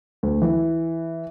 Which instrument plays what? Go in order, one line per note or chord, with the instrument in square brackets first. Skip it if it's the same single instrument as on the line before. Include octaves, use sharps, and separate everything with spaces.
[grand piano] D2
E3